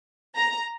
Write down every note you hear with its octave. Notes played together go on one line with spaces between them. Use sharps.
A#5